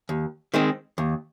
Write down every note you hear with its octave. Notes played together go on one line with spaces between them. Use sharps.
D#2
D#3 G#3 C4
D#2